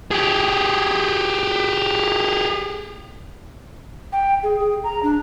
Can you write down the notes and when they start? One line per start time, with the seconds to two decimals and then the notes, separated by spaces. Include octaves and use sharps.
0.11 G4 G#4
4.12 G5
4.43 G#4
4.60 G#4
4.84 A#5
5.03 D4